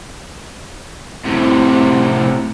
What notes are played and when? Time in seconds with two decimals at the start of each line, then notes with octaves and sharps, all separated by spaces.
1.25 A2 C3